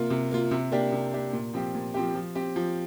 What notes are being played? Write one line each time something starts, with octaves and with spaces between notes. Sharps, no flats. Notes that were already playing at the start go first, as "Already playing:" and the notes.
Already playing: C3 A#3 F4
C3
A#3 F4
C3
A#3 D4 G4
C3
A#3 D4 G4
A#2
F3 C4 G4
A#2
F3 C4 G4
F3
C4 G4
F3